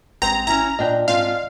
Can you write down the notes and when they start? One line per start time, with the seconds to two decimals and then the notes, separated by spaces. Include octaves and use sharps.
0.22 A1 G#3 C4 G5 A#5
0.47 C#4 E4 A#5
0.79 A#2 D4 D5 D#5 G5
1.08 G#2 C4 F4 F5